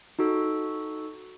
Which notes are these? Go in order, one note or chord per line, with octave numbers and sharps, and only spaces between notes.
D#4 F#4 A4